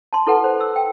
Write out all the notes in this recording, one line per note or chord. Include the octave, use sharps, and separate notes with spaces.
A5 C6
E4 A4 B4 F#5 G#5 A5
C5
E6
G5